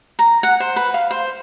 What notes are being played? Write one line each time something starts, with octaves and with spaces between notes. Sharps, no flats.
A#5
F#5
C5
B4
F5
C5